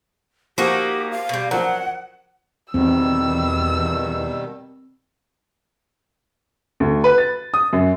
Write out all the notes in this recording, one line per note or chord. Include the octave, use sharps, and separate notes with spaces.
F3 A#3 D#4 F#4 G4
F5
B2 G3
F3 F#3 A#4 F#5
E2 B2 D#3 G3 C4 E6
D2
B4
A6
D#6
F#2